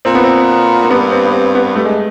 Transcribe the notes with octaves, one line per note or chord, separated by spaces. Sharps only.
A#2 C4
B3
C4
A#3
G2 B3
C4
B3
C4
B3
G2 A3
G#3